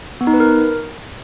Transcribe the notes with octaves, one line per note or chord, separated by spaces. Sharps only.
B3
D#4
B4
A#4